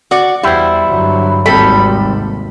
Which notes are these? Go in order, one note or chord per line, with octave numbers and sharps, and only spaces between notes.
F#4 D5
E2 G3 E4 C5
G2 D3 F#3
G#1 D#2 C3 G3 C4 A4 B5